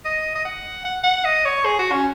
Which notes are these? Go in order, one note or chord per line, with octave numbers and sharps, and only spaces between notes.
D#5
D#5
F#5
F#5
F#5
D#5
C#5
G#4
F#4
C#4